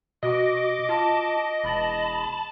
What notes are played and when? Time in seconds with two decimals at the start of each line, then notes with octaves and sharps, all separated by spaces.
0.23 B2 F#4 D#5 D6
0.89 F4 A5
1.64 E1 A5 B5